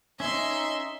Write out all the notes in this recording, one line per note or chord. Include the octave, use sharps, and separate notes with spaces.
C#4 D#4 E5 C6